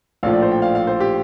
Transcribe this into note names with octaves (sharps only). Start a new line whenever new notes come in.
A#1 A2 F3 F5
D5
C5
G5
F5
F5
C5
G4